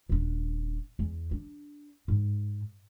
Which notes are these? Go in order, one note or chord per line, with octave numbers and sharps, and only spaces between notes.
D#1 D4
E2
D4
G#2